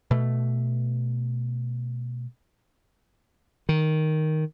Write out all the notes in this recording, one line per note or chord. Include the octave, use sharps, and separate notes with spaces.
B2 A3
D#3